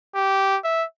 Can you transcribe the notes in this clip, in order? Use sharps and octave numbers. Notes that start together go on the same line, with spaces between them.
G4
E5